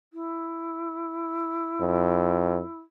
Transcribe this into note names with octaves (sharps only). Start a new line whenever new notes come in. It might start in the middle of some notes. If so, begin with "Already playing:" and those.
E4
F2